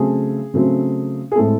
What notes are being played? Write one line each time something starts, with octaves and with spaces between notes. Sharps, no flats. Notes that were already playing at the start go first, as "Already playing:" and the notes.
Already playing: C#3 F#3 A3 C4 G#4
C#3 F#3 A3 C4
G#4
A2 G#3 C4 A4